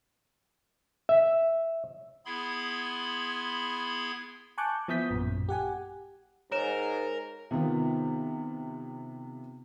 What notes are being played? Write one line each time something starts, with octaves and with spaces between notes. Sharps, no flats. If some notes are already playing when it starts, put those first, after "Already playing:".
E5
B3 E4 G#4 B5 C6 G#6
G#5 A5 C#6 D6 F#6 G6
F3 B3 E4 D#6 G6 B6
A1 F#2 A#2
G4 F#5 G#5
G#2 A#4 C#5 E7
C3 D#3 B3 F4